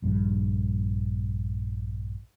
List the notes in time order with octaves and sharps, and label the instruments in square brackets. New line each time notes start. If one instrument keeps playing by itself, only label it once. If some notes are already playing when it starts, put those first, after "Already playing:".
[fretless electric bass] A#1 G2